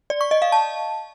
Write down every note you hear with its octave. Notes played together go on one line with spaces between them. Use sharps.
D5
C#6
D#5
F5
A5